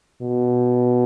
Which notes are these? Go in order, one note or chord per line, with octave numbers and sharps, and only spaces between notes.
B2